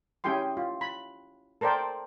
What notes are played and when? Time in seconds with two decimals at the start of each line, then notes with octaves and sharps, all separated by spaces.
0.24 C#4 E4 G4 G#4 G5 C6
0.57 F4
0.81 B5
1.61 A4 A#4 C5 D5 G5